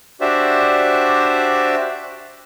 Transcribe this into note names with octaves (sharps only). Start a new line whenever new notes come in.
D4 F#4 G4 C5 D5 E5